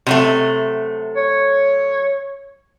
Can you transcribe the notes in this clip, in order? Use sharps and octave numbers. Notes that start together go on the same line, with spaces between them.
C3 F#3 A3
C#5